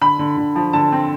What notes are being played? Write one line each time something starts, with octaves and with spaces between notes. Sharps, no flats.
D3 B5
D3
D3
F3
D3 A5
C4